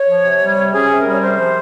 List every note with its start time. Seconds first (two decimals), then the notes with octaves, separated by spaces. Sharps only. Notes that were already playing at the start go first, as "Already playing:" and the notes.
Already playing: C#5
0.08 F3
0.25 C3
0.41 G3
0.57 C3
0.73 C#4 G#4
0.90 C3
0.98 A#4
1.06 G3
1.12 C#5
1.22 C3 C5
1.38 F3